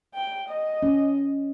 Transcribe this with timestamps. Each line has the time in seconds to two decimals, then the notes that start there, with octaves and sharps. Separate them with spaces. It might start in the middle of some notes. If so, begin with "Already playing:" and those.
0.14 G5
0.48 D#5
0.83 C#4